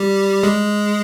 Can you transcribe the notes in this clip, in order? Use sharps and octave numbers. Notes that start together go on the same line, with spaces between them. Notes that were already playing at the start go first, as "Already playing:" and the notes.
Already playing: G3 G4
G#3 G#4